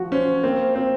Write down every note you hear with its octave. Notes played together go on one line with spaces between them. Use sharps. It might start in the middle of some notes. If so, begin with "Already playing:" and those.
Already playing: F3 F#4
C#4 C5
A#3 C4
C4 C5